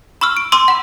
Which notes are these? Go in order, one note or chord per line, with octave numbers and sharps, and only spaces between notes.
B5 C#6 E6 F6
D7
C6 D6 E6 D#7
F#5 B5